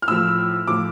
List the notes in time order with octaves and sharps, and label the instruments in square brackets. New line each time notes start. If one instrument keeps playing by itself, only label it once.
[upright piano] F6
A2 F3 E6
A2 F3 D6